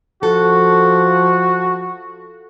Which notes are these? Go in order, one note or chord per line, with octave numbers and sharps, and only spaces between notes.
F3 F#4 A4